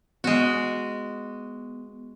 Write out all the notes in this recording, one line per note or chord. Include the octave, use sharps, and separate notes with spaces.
G#3 B3 F#4